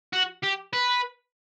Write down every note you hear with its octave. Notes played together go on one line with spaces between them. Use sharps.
F#4
G4
B4